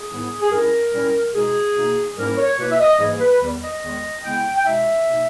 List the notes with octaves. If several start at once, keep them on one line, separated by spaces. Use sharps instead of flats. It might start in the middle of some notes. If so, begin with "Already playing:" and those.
Already playing: G#4
G#2 D#3 G3 B3 E4
G#4
G2 G3 C#4 E4 A#4
A#2 G3 C#4 E4
B2 G#3 D#4 G#4
B2 A#3 D#4
G#2 G3 A#3 C#4 E4 A#4
C#5
B2 A#3 E4 B4
E5
D#5
G#2 E3 G3 A#3 G#4
B4
E2 D#3 G3
D#5
E2 D#3 G#3
C#3 G#3 B3 E4 G5
G5
B2 G#3 D#4 E5
B2 A#3 D#4